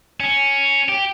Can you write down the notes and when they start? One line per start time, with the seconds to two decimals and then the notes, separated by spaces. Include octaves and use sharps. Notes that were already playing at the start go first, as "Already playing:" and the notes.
0.20 C#4
0.89 G4